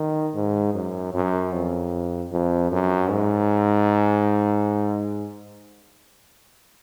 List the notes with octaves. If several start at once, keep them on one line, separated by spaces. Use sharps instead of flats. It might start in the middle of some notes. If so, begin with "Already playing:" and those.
Already playing: D#3
G#2
F#2
F#2
F2
F2
F#2
G#2